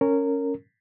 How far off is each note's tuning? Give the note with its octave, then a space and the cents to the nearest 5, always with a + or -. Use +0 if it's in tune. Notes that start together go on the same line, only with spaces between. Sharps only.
C#4 +0 A#4 -20